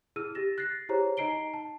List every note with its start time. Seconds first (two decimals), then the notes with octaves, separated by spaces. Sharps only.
0.16 E4 G#4 E6 F6 D#7
0.35 G4 A6 A#6 E7
0.58 F#6 A6 A#6 C7
0.89 E4 G4 G#4 C5 C#5 A#5
1.17 D#4 D#5 A#5 C7 D7 G7
1.54 A5